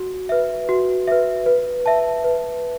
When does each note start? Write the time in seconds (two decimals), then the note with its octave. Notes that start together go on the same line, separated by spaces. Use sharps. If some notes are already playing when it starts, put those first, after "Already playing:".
Already playing: F#4
0.29 B4 E5
0.69 F#4
1.08 B4 E5
1.46 B4
1.86 E5 A5
2.24 B4